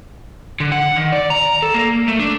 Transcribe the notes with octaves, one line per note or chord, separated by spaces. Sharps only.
D3
F#5
D#3
D5
A#5
A4
A#3
A3
D4